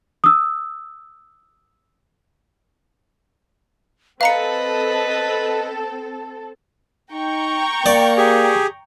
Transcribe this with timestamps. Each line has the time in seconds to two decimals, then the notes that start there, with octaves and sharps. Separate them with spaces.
0.24 D#6 E6
4.21 C4 A4 B4 D#5 F5 A#5 C#7
7.12 D#4 G5 A#5 C#6
7.86 A#3 D5
8.17 G4 G#4